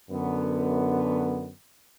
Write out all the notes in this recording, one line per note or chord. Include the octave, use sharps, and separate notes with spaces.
F#2 D3 B3